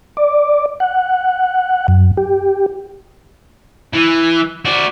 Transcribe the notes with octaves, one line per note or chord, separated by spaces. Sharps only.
D5
F#5
F#2
G4
E3
F#4 D5